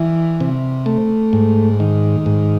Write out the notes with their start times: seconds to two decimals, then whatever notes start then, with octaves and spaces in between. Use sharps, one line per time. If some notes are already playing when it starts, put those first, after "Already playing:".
Already playing: E3
0.40 C3
0.86 A3
1.33 G#2
1.80 D#3
2.26 G#2